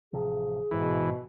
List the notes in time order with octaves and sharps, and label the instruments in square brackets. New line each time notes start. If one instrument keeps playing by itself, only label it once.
[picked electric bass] A1 C3 F3 [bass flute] G#4
[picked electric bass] A1 G#2 [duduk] B2 [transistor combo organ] E3